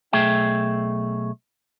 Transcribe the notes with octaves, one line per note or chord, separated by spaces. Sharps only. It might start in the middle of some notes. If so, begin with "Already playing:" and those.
B1 A3 G#4 E5 G5